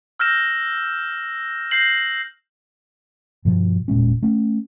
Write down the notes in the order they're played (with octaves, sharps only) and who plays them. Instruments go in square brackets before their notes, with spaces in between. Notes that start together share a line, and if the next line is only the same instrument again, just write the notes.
[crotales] E6 F6 G6 A#6 E7
G6 A#6 C7 F#7
[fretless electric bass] G2 B2 F3
E1 A#2 G#3 C#4
A3 C#4